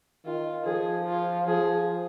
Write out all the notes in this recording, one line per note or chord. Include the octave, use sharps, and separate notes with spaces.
D#3 F4
F3 G#4
F4
F3 G#4